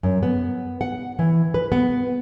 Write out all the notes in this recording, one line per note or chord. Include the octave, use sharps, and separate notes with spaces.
F#2
B3
F#5
E3
B4
B3